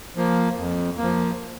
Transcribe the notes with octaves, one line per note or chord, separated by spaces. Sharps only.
F3 A#3
F2
A#3
F3